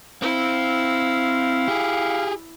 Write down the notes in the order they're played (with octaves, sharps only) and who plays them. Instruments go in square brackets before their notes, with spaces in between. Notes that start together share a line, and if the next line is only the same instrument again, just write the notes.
[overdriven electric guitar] C4 [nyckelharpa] E4 [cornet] F5
[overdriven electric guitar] G4 G#4